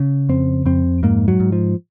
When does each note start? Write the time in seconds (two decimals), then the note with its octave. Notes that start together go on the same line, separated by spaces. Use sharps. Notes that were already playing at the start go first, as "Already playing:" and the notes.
Already playing: C#3
0.29 F2 C4
0.66 F2 C4
1.03 G#2 A#3
1.28 F#3
1.40 G#2
1.52 F3